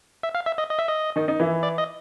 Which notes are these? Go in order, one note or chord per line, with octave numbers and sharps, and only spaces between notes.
E5
F5
E5
D#5
D#5
E5
D#5
D#3 D#4
D#4
E3 E4
D5
D#5